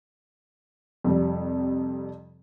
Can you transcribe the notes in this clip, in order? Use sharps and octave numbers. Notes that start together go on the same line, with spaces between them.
F2 C3 G3